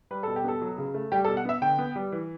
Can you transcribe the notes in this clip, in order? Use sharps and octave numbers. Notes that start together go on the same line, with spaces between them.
G3 B4
B2 A4
G4
B3 A4
F#3
C#3
A3
G3 G4
A4
B2
F#5
B3 E5
D3 G5
B3
G3
E3